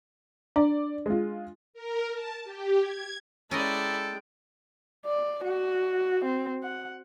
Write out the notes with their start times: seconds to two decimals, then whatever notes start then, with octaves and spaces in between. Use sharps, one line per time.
0.56 D4 D5
1.06 G#3 F4
1.74 A#4
2.12 A5
2.44 G4
2.79 G#6
3.51 G#3 C#4 E4 A4 A#4 D5 D#5 G5
5.06 D5
5.44 F#4
6.25 C4
6.64 F#5